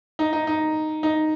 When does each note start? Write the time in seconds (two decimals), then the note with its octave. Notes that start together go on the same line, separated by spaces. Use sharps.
0.19 D#4
0.33 D#4
0.47 D#4
1.03 D#4